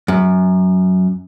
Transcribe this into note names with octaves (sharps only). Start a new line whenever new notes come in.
F#2